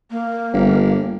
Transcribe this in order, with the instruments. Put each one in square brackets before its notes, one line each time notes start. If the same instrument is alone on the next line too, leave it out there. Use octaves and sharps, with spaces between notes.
[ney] A#3
[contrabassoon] G1